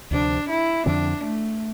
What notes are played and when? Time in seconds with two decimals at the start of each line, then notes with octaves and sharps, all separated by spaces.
0.11 D2 C3 F3 D4
0.49 E4
0.86 F2 D3 F3 C4 D4
1.23 A3